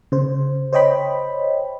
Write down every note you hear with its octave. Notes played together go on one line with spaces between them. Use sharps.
C#3 C5
C5 C#5 D#5 G5 B5